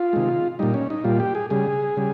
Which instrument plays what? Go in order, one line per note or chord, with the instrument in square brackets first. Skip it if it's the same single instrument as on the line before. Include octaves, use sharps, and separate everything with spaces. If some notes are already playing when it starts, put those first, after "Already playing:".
Already playing: [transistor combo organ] F4
C3 D#3 G#3
A#2 G3 D#4
C#4
D#4
A#2 G3 F4
G4
G#4
C#3 G3 G#4
C#3 G3